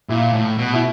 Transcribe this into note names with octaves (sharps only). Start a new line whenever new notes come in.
A#2 E4
A2
B2
E4